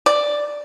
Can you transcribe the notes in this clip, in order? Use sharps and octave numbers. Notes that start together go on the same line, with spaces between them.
D5